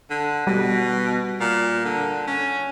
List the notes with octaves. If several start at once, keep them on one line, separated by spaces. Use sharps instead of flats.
D3
B2 G3
A#2
D3
C#4